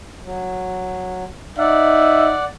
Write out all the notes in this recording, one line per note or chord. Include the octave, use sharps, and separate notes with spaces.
F#3
D#4 D5 E5 F#5